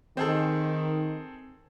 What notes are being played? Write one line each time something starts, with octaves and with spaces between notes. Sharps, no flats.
D#3 C4 G#4 A4